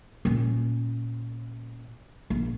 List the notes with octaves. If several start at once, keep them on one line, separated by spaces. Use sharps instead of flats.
A#2 C#4
A#1